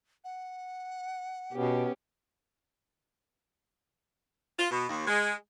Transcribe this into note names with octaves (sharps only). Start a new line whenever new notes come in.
F#5
B2 B3 C#4 G4
F4
B2
D#2
G#3